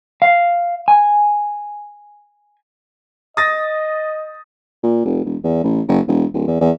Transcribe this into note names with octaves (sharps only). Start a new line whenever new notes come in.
F5
G#5
D#5 D#6 A6 A#6
A#2
F1
E1
E2
A1
F#1
E1
D1
E2
E2